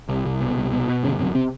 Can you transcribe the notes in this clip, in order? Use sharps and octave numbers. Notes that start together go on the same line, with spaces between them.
C2
C2
B2
C2
B2
B2
G1 C#3 C#4
F#2 C3 C4
C3 C4